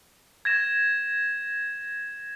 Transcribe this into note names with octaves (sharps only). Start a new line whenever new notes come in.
G#6 A#6 E7